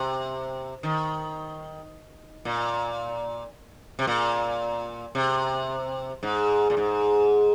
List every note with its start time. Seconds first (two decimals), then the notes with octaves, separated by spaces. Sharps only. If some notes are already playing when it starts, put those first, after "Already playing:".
Already playing: C3
0.83 D#3
2.45 A#2
3.99 C3
4.07 A#2
5.15 C3
6.23 G#2
6.70 A#2
6.77 G#2